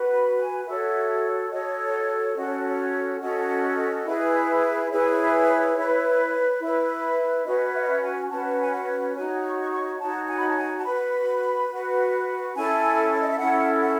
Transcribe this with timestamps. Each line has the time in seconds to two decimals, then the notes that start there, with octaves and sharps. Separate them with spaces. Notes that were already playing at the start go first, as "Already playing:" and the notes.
Already playing: F#4 B4
0.10 B5
0.39 G#5
0.67 F#4 A4 C#5 E5
1.51 F#4 A4 C#5 D#5
2.36 C#4 F#4 A4 D#5
2.46 C#5
2.69 C#5
3.20 C#4 F#4 A4 D#5
4.05 E4 G#4 B4
4.90 E4 G#4 B4 C#5
5.76 E4 B4
6.60 E4 B4
7.45 C#4 F#4 B4 D#5
7.74 E5
7.81 D#5
7.89 E5
8.02 G#5
8.30 C#4 F#4 B4 A5
8.61 G#5
8.73 F#5
9.16 D#4 F#4 C#5 G#5
9.43 C#6
9.60 C#6
9.71 C#6
9.99 D#4 F#4 C#5 A5
10.28 G#5
10.38 B5
10.47 A5
10.57 G#5
10.78 A5
10.85 F#4 B4 B5
11.70 F#4 B4
12.55 C#4 E4 A4 G#5
13.12 C#5
13.20 D#5
13.30 E5
13.39 C#4 E4 A4 F#5
13.81 F#5